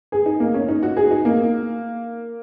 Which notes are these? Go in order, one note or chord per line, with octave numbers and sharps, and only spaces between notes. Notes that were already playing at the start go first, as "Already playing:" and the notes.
G#4
D#4
A#3
C#4
D#4
F#4
G#4
D#4
A#3